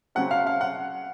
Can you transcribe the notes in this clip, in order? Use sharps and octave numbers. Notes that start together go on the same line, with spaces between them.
C#3 F#3 C4 F#5
F5
F5
F#5